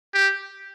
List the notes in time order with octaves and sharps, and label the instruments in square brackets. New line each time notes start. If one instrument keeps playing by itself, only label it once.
[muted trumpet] G4